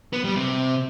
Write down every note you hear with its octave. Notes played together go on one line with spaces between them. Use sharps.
B3
G3
C3